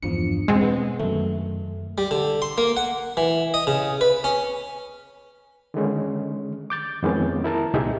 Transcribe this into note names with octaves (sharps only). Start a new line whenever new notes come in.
E2 G2 F3 D4 C#7
B2 G#3 C4
B3
F#2 D#3 A3
G3
D3
C6
A#3
F#5
E3
D#5
C#3
B4
C#4
D3 D#3 G#3 C#4
D6 G6 A6
F2 D#3 G#3 B3 C#4
E4 A#4 A5 A#5
C2 A#2 D#4 G4 G#4 E5